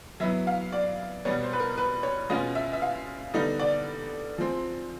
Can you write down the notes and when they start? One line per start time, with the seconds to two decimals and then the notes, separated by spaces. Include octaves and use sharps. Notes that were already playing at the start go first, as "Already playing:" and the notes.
0.20 F#3 B3 E4 E5
0.47 F5
0.72 D5
1.25 B2 G3 B3 C#5
1.43 C5
1.53 B4
1.60 A#4
1.78 B4
2.03 C#5
2.30 B2 G#3 C#4 F4 D#5
2.55 E5
2.73 E5
2.82 F5
3.34 D3 G3 B3 D#4 D#5
3.59 D5
4.38 F3 G#3 C4